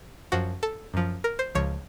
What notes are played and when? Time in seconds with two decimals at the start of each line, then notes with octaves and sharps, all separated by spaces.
0.32 F#2 F3 F#4
0.63 A4
0.94 F#2 F3
1.24 A#4
1.39 C5
1.55 C#2 C#3 F3 C#5